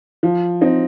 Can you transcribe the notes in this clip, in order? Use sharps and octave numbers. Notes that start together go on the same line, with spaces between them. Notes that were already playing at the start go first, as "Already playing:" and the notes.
F3
C4 D#4